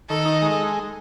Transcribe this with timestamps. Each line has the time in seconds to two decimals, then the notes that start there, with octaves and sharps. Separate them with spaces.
0.09 D#3 A4
0.26 D#4
0.42 G#3